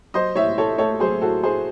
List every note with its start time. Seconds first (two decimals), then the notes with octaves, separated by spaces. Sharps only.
0.14 F#3 C5 D#5
0.36 A2 C#5 E5
0.57 A2 A4 C#5
0.78 A3 A4 C#5
1.00 F#3 G#4 C5
1.21 A2 F#4 A4
1.43 A2 G#4 C5